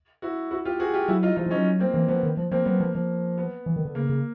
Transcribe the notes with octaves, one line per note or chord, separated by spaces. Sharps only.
E4 F#4
E4 F#4
F4 G4
F#4 G#4
F4 G4
F#3 E4 F#4
D#4 F4
F3 D#4 F4
F3
C#4 D#4
F#3
A#3 C4
E3 A#3
F3 B3
D#3
F3
F3 A#3 C4
F#3 B3
F3 A#3
F3
B3
E3
D#3
D3
C#3 A#3
C#3